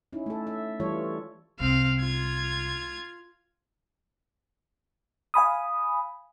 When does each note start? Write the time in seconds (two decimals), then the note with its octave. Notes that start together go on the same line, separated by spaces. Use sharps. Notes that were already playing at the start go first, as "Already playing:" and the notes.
0.13 C#4 D#4 E4
0.26 A3 A4
0.47 E5
0.80 E3 G3 F4 A4 C#5
1.60 C2 C4 F5
2.00 F4 G#6
5.34 F5 G#5 B5 D#6